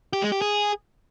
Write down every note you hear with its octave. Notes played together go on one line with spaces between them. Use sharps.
G4
G#3
G4
G#4